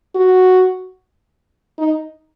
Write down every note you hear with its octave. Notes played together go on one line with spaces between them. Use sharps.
F#4
D#4